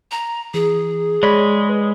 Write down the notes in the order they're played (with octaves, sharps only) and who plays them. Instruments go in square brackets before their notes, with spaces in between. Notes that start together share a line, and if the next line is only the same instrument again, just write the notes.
[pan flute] A#5
[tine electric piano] E3 [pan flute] G#4
[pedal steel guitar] G#3 [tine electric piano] C#5 D5 B5
[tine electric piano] B4